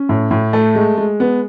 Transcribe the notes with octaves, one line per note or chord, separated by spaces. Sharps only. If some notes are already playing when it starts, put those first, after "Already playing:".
Already playing: C#4
A2
A2
A3
G#3
G#3
B3